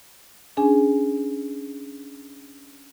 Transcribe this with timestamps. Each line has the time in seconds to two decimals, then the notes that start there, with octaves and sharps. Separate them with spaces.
0.57 C#4 D4 G#4 G#5